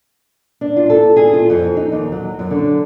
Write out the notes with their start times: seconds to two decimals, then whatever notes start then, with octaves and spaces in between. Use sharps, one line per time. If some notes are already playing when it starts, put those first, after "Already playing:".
0.61 D4
0.77 F4
0.90 A4
1.16 G#4
1.33 F4
1.50 F2
1.77 D#4
1.92 D#2
2.12 F#3
2.39 F#2
2.51 D3